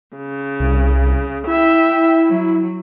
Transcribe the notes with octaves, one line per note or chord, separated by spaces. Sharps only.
C#3
C2
E4 E5 G5
F#3